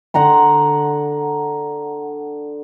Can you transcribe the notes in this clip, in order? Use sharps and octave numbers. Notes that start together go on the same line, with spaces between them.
D3 F#5 A#5 C6